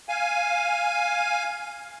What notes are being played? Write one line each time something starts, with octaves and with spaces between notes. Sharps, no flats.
F5 G#5